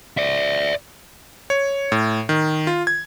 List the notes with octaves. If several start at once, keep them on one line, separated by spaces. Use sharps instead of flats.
D5 E5
C#5
A2
D#3
F4
G#6